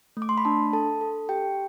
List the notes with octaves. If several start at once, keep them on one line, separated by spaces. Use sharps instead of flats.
A3
D6
C6
B5
D4 A5
A4 A5
A4
G4 G5